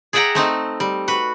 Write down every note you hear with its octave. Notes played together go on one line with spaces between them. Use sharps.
G#4 D5 E5 F#5 G5 A#5
A3 C4 D#4
G3
F#4 B4